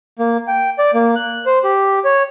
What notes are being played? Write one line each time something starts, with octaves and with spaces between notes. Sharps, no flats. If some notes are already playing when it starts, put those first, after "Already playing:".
A#3
G5
D5
A#3
F#6
C5
G4
C#5